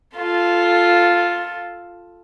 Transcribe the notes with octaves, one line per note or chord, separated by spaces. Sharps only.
F4 A4